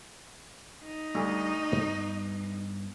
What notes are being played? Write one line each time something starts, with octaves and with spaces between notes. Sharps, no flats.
D#4
D2 G3
G2 B3